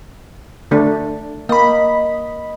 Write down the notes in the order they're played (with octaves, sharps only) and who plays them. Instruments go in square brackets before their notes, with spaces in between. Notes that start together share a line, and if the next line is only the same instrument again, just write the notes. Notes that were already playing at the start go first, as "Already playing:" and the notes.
[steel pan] D3 A3 D4
[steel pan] A#3 [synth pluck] D#5 B5